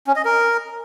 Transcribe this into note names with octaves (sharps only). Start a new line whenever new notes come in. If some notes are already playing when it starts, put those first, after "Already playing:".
C#4
D#5
A#4